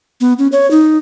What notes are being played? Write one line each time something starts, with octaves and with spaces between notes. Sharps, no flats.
B3
C#4
C#5
D#4